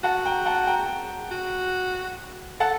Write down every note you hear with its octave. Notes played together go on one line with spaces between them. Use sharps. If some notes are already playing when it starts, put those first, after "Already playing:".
F#4 F#5 A5
G5 A#5
F#5 A5
G5 A#5
F#4
A4 F#5 A5